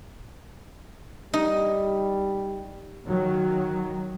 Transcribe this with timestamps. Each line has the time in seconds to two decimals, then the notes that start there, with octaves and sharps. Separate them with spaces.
1.34 G3 D#4
3.06 D#3 F#3